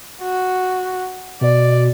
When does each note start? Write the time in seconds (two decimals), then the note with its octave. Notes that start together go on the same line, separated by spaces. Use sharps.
0.22 F#4
1.41 B2 D5